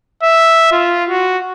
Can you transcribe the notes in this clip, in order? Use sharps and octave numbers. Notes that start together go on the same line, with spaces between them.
E5
F4
F#4